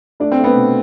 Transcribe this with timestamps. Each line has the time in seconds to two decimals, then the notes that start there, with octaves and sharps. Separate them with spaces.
0.20 A3 D4 D5
0.32 C4 C5
0.38 A3
0.44 B3 B4
0.56 B2